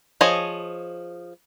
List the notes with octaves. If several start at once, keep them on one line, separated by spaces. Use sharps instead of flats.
F3 G#4 C#5 D#5